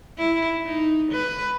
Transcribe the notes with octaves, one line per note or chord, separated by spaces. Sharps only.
E4
D#4
B4